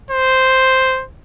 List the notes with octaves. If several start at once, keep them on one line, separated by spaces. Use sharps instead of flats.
C5